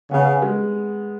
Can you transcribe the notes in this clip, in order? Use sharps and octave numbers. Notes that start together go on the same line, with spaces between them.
C#3 B3
G#3